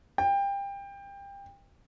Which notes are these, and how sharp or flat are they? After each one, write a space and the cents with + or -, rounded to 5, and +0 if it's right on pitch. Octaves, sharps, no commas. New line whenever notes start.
G5 +25